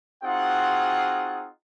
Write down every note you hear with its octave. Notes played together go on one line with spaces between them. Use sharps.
C4 D#4 F4 F#4 G#4 F#5